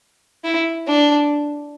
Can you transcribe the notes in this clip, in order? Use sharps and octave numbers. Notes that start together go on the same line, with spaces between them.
E4
D4